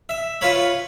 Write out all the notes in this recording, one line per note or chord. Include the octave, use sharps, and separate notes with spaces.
E5
F4 B4 C#5 B5